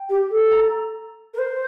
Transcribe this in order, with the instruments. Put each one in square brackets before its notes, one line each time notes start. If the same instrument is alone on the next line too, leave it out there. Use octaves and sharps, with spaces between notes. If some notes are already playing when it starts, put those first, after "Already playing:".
Already playing: [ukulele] G5
[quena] G4
A4
[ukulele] A#5
[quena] A#4
C5